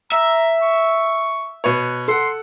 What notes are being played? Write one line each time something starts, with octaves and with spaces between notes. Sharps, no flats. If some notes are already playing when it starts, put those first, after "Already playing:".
E5 A#5
C#6
B2 B4 C#5
A4 F#5 C6